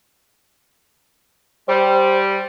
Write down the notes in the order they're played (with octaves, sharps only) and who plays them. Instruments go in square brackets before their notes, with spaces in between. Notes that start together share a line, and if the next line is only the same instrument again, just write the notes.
[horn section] G3 [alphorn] C5